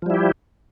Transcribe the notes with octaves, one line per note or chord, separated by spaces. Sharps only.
F3 G3 E4 G4